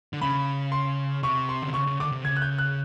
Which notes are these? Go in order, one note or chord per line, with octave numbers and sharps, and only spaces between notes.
D3
C#3 B5
C6
C3 C#6
C6
D3
C#3 C#6
C#3
D3 D6
C3
C#3 G#6
F#6
G6
F#6